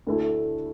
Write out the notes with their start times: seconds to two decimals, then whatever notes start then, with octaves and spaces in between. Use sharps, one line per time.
0.07 D2 D3 A3 E4 A4